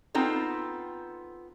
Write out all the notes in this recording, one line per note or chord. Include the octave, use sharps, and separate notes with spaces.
B3 C4 D#4 F4 A4